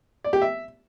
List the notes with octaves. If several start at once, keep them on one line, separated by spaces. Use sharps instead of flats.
D5
G4
E5